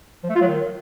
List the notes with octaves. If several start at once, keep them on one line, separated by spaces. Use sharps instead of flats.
F3
A3
F4
F#3
D#3